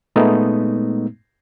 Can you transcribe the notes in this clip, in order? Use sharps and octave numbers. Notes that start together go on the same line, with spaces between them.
A#2 G#3 A3 B3 D#4